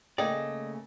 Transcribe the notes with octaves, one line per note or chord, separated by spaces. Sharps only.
C#3 A3 A#3 D5 D#5 G5 G#5